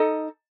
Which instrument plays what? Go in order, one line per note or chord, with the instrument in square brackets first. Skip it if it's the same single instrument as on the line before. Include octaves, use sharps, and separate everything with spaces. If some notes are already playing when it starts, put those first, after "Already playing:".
Already playing: [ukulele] D#4 A4 D#5